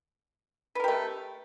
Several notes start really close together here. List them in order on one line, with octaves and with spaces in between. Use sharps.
B4 A#4 G4 A3